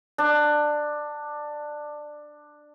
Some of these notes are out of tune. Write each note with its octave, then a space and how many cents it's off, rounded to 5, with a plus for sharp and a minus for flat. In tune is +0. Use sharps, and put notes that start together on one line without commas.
D4 +15